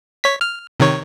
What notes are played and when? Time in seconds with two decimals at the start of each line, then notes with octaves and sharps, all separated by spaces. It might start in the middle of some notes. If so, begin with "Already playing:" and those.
0.24 C#5 B6
0.41 F6
0.80 C3 D#3 C#5